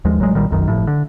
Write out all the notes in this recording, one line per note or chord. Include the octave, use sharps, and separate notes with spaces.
D#2 F3 G#3
A1 F#3 G#3
B1 A#2 D#3 G3
F1 B1 F#2 D#3
G1 A2 F3
D3